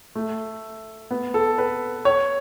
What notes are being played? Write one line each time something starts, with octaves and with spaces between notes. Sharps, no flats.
A3
B3
A4
B4
C#5